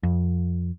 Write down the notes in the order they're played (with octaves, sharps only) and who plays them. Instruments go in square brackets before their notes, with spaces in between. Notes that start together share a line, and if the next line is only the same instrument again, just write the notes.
[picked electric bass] F2